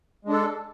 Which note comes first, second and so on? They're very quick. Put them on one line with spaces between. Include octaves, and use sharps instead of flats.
G#3 D4 A4